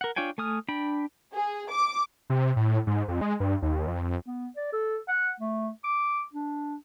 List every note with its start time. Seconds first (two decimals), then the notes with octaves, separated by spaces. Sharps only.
0.01 A#4 F#5
0.16 D4 F4 C#5 G5 G#5
0.38 A3 G#5 D#6 F6
0.68 D4 G5 B5
1.33 G#4
1.71 D6
2.30 C3
2.56 A2
2.87 G#2
3.08 F2
3.21 G#3
3.40 G2
3.62 D#2
3.88 F2
4.27 B3
4.57 D5
4.73 A4
5.08 F#5
5.40 A3
5.84 D6
6.33 D4